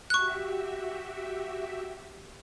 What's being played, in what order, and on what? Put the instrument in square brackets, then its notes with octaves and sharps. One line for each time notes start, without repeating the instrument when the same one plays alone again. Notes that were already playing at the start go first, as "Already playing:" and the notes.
[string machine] F#4 G4 E5 [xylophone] C#6 F#6